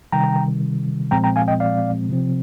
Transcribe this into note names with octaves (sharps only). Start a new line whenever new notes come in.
C3 D#3 G3 G5 A#5
A#2 F3 G#3 C4 G5 A#5
G5 A#5
F5 G#5
D#5 G5
D5 F5
C3 F3 C4